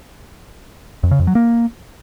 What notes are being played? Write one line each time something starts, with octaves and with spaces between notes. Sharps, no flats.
F2
C#3
F2
F#3
A#3